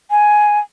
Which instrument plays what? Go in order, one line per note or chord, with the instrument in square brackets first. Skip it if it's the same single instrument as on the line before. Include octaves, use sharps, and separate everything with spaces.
[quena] G#5